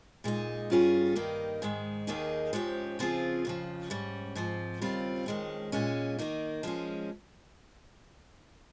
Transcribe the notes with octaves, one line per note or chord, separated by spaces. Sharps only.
A#2 G#3 D#4
G2 G3 C#4 F4 G#4
G2 D#3 A#3 D#4 G4
G#2 D#3 G#3
D#2 D#3 A#3 D#4 G#4
G#2 F3 G#3 C#4 G4
C#3 F3 C4 F4 G#4
F2 C#3 F3
G#2 G3 C#4
G#2 F3 C4
D#2 C#3 G3 C4 F4
F2 D#3 G#3 C#4
A#2 G#3 C#4
D#3 A#3 D#4
F3 G#3 C#4